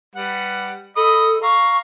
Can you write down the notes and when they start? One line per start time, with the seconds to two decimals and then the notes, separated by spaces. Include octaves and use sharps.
0.15 G3 B4 F#5
0.96 A4 D#5 B5 D#6
1.42 F5 A#5 C#6